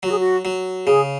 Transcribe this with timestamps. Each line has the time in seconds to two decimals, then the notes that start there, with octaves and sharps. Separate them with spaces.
0.03 F#3 F#4
0.12 G#4
0.19 F#4
0.45 F#3
0.86 C#3 G#4